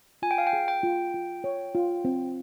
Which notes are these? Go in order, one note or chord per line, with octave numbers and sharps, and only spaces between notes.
F4 G#5
G5
F5
G5
G#4
G5
F4
F4
C#5
F4
C4